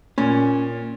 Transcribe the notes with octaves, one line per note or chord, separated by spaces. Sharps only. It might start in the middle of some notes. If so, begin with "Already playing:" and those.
A#2 C#4